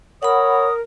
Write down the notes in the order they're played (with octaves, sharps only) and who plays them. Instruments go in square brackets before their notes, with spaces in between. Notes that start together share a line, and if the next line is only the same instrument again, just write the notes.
[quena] A#4 [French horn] C#5 [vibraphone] F#5 B5 [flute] D#6